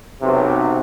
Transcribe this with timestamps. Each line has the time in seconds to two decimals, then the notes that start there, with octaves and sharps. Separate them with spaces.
0.22 B1 C3